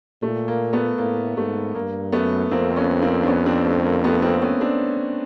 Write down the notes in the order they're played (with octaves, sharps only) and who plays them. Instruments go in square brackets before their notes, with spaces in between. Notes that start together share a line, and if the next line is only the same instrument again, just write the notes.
[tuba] A#2 [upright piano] A3
[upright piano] A#3
A3 B3
[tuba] A2 [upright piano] A#3
[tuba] G#2 [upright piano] A3
[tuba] G2 [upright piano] A#3
[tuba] F#2 [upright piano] A3 B3
[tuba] F2 [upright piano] A#3 C4
[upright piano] B3 C#4
A#3 C4
D4
B3 C#4
C4 D4
A3
A#3
A3 B3
A#3 C4
B3 C#4
C4 D4